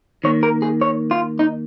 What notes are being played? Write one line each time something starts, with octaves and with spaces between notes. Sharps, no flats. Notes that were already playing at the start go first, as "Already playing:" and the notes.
D#3 A#3 C#5
A#4
G#4
C#5
F4
D#4